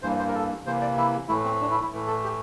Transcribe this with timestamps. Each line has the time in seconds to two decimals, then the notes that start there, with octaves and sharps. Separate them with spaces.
0.02 G2 E3 A#3 C5
0.19 C5
0.28 A#4
0.35 A4
0.66 C3 E3 A#3 C5
0.81 D5
0.97 E4
1.28 A2 E3 A3 E4
1.45 C4
1.61 D4
1.71 E4
1.82 E4
1.92 A2 E3 A3
2.07 A4
2.24 G4